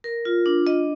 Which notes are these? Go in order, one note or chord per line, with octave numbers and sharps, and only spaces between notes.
A#4
F4
D4
D#5